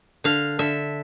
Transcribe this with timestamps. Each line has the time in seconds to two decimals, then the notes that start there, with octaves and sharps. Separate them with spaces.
0.24 D3 F5
0.59 D3 E5